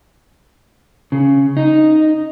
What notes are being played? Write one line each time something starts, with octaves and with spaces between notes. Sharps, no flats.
C#3
D#4